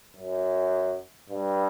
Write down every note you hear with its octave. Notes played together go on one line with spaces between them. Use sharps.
F#2
G2